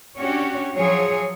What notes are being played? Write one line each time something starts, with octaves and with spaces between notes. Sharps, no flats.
C#4 D4 F#4 G4 C#5
F3 F#3 G#4 C#5